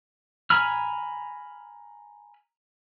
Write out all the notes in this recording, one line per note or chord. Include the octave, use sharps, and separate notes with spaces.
G#5 A#5 B5 F6